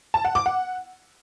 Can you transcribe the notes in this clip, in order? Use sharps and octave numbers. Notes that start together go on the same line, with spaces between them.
A5
F#5
D6
F#5